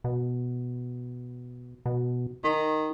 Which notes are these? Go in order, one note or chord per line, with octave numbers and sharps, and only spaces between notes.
B2
B2
D#3 D#4